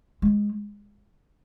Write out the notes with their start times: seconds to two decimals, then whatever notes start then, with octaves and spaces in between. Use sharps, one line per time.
0.22 G#3